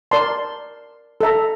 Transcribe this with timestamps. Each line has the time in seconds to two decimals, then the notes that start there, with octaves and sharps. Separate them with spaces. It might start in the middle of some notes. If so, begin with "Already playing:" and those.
0.11 A#4 D5 A5 C6
1.21 A4 E5 A#5